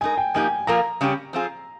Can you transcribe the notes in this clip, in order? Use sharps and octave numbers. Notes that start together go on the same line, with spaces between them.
G#3 D#4 A#4 G#5
G5
F3 A#3 D#4 G4 G#5
A#2 F3 A#3 F4 A#4 A#5
C#3 G3 C#4 G4
F3 C4 F4 G#4